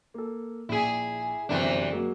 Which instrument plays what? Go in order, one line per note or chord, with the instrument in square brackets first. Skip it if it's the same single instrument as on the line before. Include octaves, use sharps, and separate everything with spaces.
[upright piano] A#3 A4
[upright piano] A#1 [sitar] E4 G#4
[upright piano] G1 F#2 G5 [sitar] C3 E3 D4
[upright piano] F#3 G#3 A#3